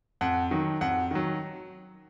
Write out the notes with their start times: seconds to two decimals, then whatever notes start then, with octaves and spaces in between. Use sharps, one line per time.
0.21 F2 F#5
0.51 D#3 F#3
0.81 F2 F#5
1.11 D#3 F#3